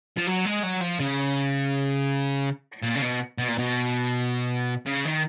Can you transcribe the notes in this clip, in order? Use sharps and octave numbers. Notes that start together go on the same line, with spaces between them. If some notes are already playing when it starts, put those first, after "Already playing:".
F3
F#3
G#3
F#3
F3
C#3
A#2
C#3
B2
B2
A#2
B2
C#3
D#3